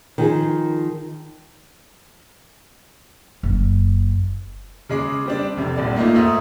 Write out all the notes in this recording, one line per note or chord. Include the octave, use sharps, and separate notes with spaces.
D#3 F3 G#4
F#1
C#3 G#3 D6
G3 C4 D4
F1 C3
D#1 G#1 D5
A3 A#3 D#4 F4
G#2 A3 D#6